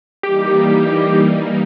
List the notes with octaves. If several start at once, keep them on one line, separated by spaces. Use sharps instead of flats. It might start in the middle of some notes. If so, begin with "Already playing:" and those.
E3 G3 A#3 D#4 G4